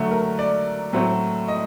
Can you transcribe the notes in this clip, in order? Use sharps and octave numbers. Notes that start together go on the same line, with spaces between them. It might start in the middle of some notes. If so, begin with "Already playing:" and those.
Already playing: D3 F#3 A3
A#4
D5
A2 F#3 A3 C4
D#5